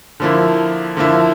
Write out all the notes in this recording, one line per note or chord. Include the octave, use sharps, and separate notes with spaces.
D3 F3 A#3 E4
D3 F3 A#3 E4